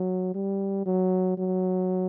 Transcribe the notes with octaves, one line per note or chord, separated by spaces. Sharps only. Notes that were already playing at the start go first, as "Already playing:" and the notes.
Already playing: F#3
G3
F#3
F#3